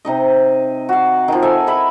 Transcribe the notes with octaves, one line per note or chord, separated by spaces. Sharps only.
C3 D#4 D#5
F#4 F5
D#3 F3
A4 A#4 E5 G#5
E4 D#5 E5 B5